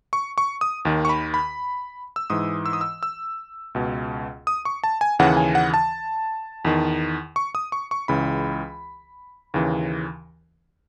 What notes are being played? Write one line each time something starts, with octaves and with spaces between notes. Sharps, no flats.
C#6
C#6
D#6
D#2 D#3
C#6
B5
B5
E6
G#2 E3 D#6
E6
D#6
E6
E6
C#2 B2
D#6
C#6
A5
G#5
D#2 C#3 E3 F#5
G#5
F#5
A5
E2 D#3
C#6
D#6
C#6
C#6
C#2 C#3 E3 B5
D#2 C#3 E3